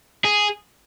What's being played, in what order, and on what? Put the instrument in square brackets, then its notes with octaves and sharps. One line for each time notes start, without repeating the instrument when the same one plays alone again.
[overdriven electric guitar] G#4